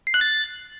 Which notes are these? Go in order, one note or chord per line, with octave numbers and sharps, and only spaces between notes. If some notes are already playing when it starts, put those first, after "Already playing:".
C7
F#6
A6